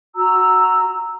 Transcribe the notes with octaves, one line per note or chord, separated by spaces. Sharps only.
F#4 A#5 E6